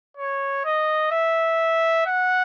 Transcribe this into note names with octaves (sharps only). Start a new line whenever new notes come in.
C#5
D#5
E5
F#5